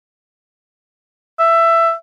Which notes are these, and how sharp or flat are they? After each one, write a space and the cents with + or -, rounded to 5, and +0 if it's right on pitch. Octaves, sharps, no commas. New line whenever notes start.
E5 +15